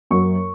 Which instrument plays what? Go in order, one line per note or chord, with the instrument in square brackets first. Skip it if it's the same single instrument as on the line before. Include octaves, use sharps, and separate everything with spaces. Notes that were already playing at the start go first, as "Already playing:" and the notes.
[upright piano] F#2 F#3 A#3 C#6